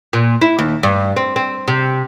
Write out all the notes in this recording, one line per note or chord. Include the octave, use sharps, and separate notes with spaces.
A#2
E4
D#2
G2
C4
C4
C3